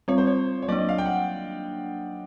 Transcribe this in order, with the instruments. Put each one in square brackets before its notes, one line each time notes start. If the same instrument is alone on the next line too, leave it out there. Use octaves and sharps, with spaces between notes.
[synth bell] G3 C4 F4 [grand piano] C#5
[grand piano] C5
C#5
C#5
[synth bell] F#3 A#3 D4 [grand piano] D5
[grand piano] D#5
F5
G5
F#5